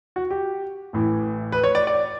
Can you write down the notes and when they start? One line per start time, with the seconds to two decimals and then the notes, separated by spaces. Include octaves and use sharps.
0.16 F#4
0.30 G4
0.93 A1 A2 E3
1.52 B4
1.63 C#5
1.75 D5
1.87 D5